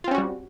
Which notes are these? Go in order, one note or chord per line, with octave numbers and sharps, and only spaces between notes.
G3 C4 C#4 F4 F#4